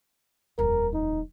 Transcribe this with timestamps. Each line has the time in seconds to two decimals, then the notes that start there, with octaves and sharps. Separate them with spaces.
0.59 D#1 F2 A#4
0.94 D#4